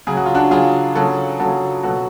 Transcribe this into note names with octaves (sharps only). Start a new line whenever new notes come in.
C#3 F#3 G#4
F#4
F4
D4 F#4
C#3 F#3 F4 G#4
C#3 F#3 F#4 A4
C#3 F#3 F#4 A4
B2 F#3 F#4 A4